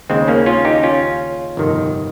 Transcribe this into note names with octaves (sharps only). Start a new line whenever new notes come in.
D#2 C#3 G#3 C4
A#3 C#4
C#4 F4
D#4 G4
C#4 F4
G1 F2 C3 D#3